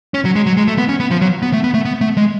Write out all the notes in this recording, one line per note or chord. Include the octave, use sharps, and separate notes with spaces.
C#4
F#3
G#3
F#3
G#3
A3
B3
C#4
B3
F3
F#3
B3
A3
B3
A3
B3
A3
G#3